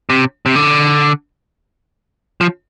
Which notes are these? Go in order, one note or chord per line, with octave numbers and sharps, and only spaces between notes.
C3
C3
D3
F3